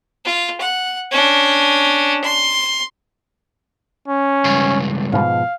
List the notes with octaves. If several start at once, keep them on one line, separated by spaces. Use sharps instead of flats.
F4
F#5
C#4 D4
C6
C#4
C#2 G2
G#2 B2 F3 F5